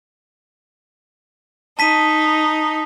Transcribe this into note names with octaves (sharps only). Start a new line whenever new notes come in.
D#4 A5 B6 D#7